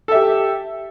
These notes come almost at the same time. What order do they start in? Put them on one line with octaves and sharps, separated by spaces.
A4 E5 G4